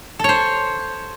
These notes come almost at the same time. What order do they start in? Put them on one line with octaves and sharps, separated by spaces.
A4 C#5 C5